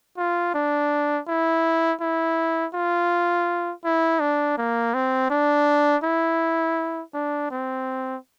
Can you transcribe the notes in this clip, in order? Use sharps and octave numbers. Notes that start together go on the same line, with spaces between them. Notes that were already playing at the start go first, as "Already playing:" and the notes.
F4
D4
E4
E4
F4
E4
D4
A#3
C4
D4
E4
D4
C4